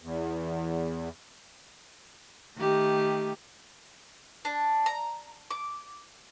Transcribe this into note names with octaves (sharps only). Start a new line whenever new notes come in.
E2
D#3 A3 G4
D4
A#5
D6